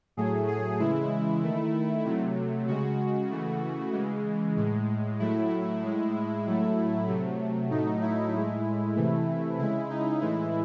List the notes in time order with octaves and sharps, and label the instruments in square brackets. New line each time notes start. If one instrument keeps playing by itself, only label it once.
[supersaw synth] A2 F#3 A3 G#4
G#4
C#3 E3 G#3 E4
D#3 A3
C3 F#3 A3
C#3 G#3 F#4
C#3 E3 A3
C#3 E3 G#3
A2 G#3
A2 F#3 A3 E4
A2 G#3
A2 F#3 A3
C3 F#3 A3
A2 F#3 A3 D#4
E4
A2 G#3 E4
C3 E3 A3
C#3 G#3 E4
D#4
A2 E3 G#3 E4